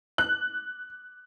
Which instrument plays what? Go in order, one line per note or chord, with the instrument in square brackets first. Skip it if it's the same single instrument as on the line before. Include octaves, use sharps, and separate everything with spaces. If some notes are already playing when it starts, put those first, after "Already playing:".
[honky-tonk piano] F#6